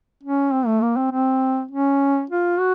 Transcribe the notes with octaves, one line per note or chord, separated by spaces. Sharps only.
C#4
C4
A3
A#3
C4
C4
C#4
F4
F#4